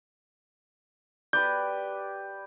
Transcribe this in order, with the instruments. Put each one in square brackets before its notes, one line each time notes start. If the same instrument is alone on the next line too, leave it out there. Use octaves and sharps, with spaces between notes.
[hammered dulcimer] G4 B4 D5 [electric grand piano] G6